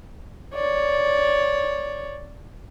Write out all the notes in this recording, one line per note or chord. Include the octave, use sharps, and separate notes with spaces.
C#5 D5